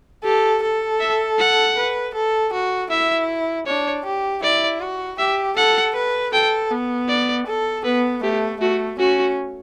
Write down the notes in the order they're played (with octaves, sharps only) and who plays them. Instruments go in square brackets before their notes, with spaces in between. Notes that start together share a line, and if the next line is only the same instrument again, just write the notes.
[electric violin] G4 [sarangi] A4
[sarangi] A4
[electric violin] E5
F#5
[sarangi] B4
A4
F#4
[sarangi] E4 [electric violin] E5
[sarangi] D4 [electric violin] C#5
[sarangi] G4
[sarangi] E4 [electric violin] D5
[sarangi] F#4
[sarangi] G4 [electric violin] E5
[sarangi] A4 [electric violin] F#5
[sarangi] B4
[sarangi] A4 [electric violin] G5
[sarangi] B3
[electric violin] D5
[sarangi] A4
[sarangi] B3 [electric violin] B4
[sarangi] A3 [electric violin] G4
[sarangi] A3 [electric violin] F#4
[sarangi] C#4 [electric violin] F#4